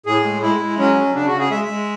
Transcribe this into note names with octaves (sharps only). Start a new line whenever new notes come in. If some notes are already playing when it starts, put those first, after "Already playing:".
A2 G#4
G#3
G#3 E4
G#3
F#3 C#4
F#3
C#3 D4
C#3 F#4
G#4
G#3 E5
G#3